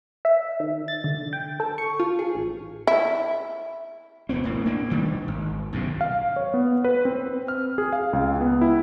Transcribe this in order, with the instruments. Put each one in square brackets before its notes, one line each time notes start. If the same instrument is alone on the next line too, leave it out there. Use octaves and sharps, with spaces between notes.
[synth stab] E5
D#3
A6
D3
G5
A4
C#6
F4
G#4
A1
[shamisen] E4
[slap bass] E1 D2 B3 C4
E1 A2 A#3
A#3 D4
G2 D#3 G3
G#1
B1 F#2 C3
[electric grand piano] F5
C#5
B3
B4
C4
F6
G#4
F5
C#2
B3
E4